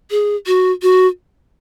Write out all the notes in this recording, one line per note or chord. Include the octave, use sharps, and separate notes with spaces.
G#4
F#4
F#4